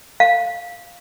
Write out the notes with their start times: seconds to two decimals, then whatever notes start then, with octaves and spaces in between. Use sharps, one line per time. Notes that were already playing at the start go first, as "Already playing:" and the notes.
0.20 F5